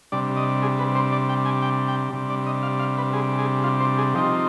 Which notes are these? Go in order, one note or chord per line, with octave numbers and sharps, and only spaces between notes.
C3 G3 D4 D5
D#5
G#4
B4
C5
D5
G5
G#5
G5
G5
C3 G3 D4
D5
D#5
F5
F5
B4
G#4
G#4
F4
C5
G#4
F3 C4 D#4 G4